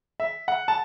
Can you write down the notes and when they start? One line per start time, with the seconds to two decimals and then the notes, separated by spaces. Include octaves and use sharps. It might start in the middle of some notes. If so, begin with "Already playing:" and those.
0.20 E5
0.48 F#5
0.68 A5